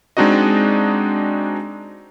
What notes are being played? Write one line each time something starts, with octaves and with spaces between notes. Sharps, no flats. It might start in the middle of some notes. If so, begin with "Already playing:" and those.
G#3 C4 D4 D#4 F#4 D#5